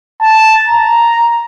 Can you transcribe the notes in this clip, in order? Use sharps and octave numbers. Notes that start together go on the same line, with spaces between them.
A5
A#5